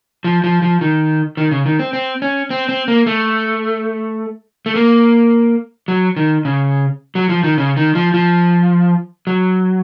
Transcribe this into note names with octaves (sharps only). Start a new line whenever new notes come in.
F3
F3
F3
D#3
D#3
C#3
D#3
C4
C4
C#4
C4
C4
A#3
A3
A3
A#3
F#3
D#3
C#3
F#3
F3
D#3
C#3
D#3
F3
F3
F#3